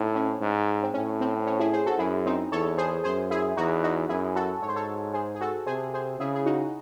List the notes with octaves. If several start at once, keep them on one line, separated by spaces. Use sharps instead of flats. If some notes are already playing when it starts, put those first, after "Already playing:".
Already playing: A2 C4 D#4
C#4
G#2
C4
A2 C#4
C4
C#4
E4 G#4
G#4 C5
F#4 A4
F#2 E4 G#4
C4 D#4
E2 A4 C#5
G#4 C5
F#2 G#4 C5
E4 G#4
E2 D#4 F#4
D#4 F#4
F#2 E4 G#4
F#4 A4
G#2 C#5
C5
A4 C#5
G#4 C5
G#4
F#4 A4
C3 G#4 C5
G#4 C5
C#3 E4 G#4
G#4
D#4 F#4